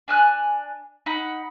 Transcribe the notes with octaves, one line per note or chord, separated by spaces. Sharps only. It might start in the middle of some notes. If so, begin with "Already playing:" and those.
D4 G#5 F6 F#6
D#4 F#5 B5